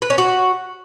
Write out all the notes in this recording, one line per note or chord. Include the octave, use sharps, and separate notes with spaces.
B4
C#4
F#4